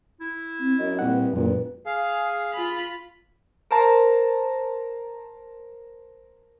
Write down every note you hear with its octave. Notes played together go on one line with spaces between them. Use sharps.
E4
C4
F#2 D#5
C2 A#2 F#5
B4
E1 F#2 A#2 B4
G#4 F5
F4 B5
A#4 C5 A5 A#5